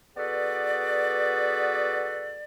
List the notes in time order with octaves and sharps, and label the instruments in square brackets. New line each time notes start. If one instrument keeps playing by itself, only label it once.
[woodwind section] B3 F#4 G#4 A4 B4 D5